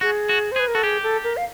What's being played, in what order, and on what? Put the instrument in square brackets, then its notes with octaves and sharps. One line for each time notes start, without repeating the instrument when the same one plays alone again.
[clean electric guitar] F#4 [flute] G#4
[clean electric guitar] F#4
[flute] C5
[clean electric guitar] G#4
[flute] B4
A#4
[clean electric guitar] F#4 [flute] A4
[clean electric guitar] G4 [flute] G#4
[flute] A4
A#4
F5